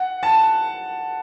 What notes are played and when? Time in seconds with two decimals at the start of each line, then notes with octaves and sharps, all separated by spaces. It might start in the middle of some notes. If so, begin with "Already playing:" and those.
Already playing: F#5
0.23 A5